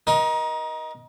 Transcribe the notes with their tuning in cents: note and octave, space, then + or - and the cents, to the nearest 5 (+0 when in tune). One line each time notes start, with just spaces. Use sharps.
D#4 +10 A#4 +30